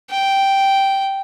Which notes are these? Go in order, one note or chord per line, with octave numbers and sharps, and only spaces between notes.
G5